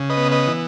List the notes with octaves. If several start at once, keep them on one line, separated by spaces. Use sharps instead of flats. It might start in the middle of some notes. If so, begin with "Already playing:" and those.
Already playing: C#3
B4 D#5
B3
B4 D#5
E3